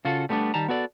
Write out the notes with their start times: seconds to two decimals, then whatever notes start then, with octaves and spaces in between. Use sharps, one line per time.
0.05 C#3 F4 F#4 A4
0.29 G3 A3 B3 C#4 D4
0.54 D#3 G3 A5 A#5
0.68 B3 F#4 A4 D5